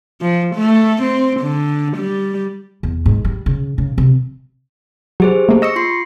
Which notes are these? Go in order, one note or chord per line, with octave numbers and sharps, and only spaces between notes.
F3
A3
C4
D3
G3
E2
G#2
G3
C#3
C#3
C3
F#3 G4 G#4 C5
A3 A#3
D#5 C#6 E6 A#6 C#7
F4 C6 C7